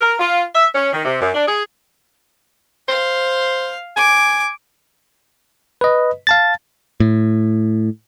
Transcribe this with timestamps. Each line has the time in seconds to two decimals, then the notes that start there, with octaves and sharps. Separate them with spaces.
0.01 A#4
0.19 F4
0.54 E5
0.74 C#4
0.93 D#3
1.05 C3
1.20 F#2
1.35 D4
1.47 G#4
2.88 C5 F5
3.97 G#5 D6
5.81 B4 D#5
6.27 F5 A5 A6
7.00 A2